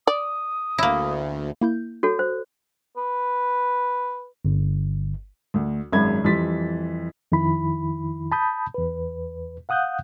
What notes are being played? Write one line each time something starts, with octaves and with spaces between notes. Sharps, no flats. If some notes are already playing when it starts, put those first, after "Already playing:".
D5 D#6
D2 A#3 E4
A#3 E4 G6
F#4 A4 C#5
C5
B4
G1
D2
G#1 F#2 G#3 E5 B5 G#6
F2 E3 G3 C6 A6 B6
F2 D#3 E4 B5
A5 B5 D#6 G6
E2 B4
F5 F#5 D#6 F#6 G6